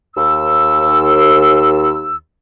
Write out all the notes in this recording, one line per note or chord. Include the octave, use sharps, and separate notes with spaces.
D#2 E6